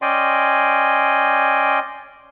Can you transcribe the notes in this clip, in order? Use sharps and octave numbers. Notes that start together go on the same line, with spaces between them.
C#4 D5 D#5 G5 G#5 C6